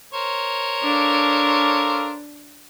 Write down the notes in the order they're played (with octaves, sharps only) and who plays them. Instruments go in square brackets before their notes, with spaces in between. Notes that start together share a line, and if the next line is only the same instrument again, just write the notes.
[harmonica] A#4 C5 C#5
[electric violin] D4 [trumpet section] A4 F5 D6